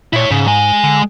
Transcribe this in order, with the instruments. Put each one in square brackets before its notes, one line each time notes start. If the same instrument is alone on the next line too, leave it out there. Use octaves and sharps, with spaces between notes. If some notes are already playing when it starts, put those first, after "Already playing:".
[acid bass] A#2 [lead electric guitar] E4 C#5
[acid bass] G#2 [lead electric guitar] C#3
[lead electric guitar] G#3 G#5
[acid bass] D3